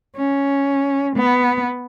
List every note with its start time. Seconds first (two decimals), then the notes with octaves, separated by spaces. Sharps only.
0.17 C#4
1.17 B3